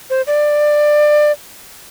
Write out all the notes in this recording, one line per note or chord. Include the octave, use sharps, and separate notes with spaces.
C5
D5